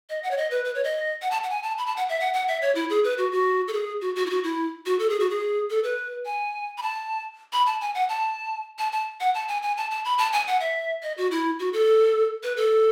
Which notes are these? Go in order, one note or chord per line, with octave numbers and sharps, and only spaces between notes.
D#5
F#5
C#5
D#5
B4
B4
C#5
D#5
F#5
A5
F#5
G#5
A5
B5
A5
F#5
E5
F#5
F#5
E5
C#5
E4
G#4
B4
F#4
F#4
A4
G#4
F#4
F#4
E4
F#4
E4
F#4
A4
G#4
F#4
G#4
A4
B4
G#5
B5
A5
B5
A5
G#5
F#5
A5
A5
A5
F#5
A5
G#5
G#5
A5
A5
B5
A5
G#5
F#5
E5
D#5
F#4
E4
F#4
A4
B4
A4